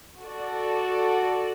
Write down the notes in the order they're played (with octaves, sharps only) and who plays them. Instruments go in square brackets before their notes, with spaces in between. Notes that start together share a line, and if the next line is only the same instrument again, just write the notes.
[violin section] F#4 A4 D5